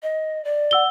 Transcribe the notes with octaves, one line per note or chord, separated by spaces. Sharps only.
D#5
D5
F#5 E6 G7